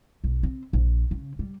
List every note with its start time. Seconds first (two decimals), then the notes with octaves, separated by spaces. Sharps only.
0.24 B1
0.43 C4
0.73 A#1
1.11 C#3
1.39 G3